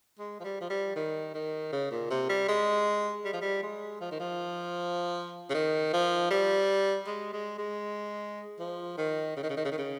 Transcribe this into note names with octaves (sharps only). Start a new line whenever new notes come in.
G#3
F3
G3
F3
G3
D#3
D#3
C#3
A#2
C3
G3
G#3
G3
F3
G3
G#3
F3
D#3
F3
C#3
D#3
F3
G3
G#3
G#3
G#3
F3
D#3
C#3
D#3
C#3
D#3
C#3
D#3
C#3